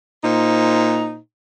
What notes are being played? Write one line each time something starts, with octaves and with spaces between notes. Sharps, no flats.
A#2 D#4 C5